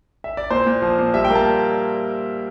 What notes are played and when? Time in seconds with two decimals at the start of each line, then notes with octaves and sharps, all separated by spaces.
0.24 E5
0.37 D5
0.50 A#2 C5
0.66 A#2
0.82 F3
0.99 A#2
1.14 G3 E5
1.25 G5
1.30 A#3
1.35 A5